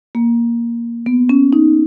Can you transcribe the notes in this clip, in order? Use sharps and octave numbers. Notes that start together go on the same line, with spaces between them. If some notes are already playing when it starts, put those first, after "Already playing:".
A#3
B3
C#4
D#4